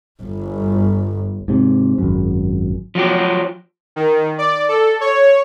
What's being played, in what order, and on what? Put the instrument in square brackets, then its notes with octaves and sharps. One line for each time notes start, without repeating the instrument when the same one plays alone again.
[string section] G1
[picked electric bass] G#2 C3
G#1 F#2
[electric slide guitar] F3 F#3 F#4 G4
[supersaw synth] D#3
D5
A4
C#5